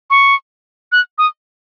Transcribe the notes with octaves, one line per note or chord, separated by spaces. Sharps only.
C#6
F#6
D#6